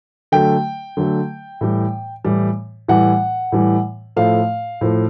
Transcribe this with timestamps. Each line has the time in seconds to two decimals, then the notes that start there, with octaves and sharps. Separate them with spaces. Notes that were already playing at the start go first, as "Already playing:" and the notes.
0.32 D3 F#3 A3 G5
0.97 D3 F#3 A3
1.61 A2 E3 G3
2.25 A2 E3 G3
2.88 A2 E3 G3 F#5
3.52 A2 E3 G3
4.16 A2 F3 A3 F5
4.81 A2 F3 A3